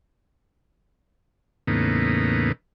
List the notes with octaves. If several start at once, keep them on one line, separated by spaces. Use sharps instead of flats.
E2 A2 C#3 A#3 B3 D#4